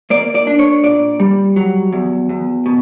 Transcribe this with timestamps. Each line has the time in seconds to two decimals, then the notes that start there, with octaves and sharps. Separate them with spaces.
0.10 A#3 D5
0.35 D5
0.47 D4
0.59 C#5
0.83 A#2 D5
1.20 G3
1.56 F#3
1.93 E2
2.29 E2
2.66 B2